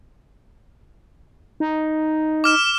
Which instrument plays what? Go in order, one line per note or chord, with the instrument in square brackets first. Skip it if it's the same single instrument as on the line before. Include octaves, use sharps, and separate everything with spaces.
[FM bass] D#4
[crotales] D6 F6 E7